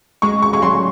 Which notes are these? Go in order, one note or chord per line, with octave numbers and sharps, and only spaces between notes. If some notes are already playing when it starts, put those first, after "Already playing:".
G#3 C#6
C#6
G#3 C#6
F#3 C6